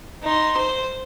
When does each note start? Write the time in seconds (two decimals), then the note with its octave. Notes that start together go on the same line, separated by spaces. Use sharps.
0.23 D#4 C6
0.57 C5